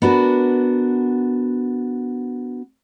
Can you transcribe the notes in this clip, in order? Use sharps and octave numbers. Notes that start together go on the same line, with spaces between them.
B3 D4 F#4 A#4